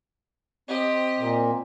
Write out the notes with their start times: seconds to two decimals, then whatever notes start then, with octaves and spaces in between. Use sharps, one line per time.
0.68 C4 G4 D#5
1.19 A#2